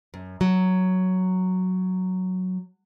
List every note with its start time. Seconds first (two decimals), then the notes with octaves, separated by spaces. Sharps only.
0.14 F#2
0.41 F#3